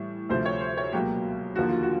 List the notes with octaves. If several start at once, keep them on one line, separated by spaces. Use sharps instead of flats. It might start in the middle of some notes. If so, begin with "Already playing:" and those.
Already playing: A2 E3 G3
D2 C3 F3 A3 C5
C#5
C5
C#5
C#2 B2 F#3 A#3 G4
D#2 D3 F3 A#3 F#4
F4
F#4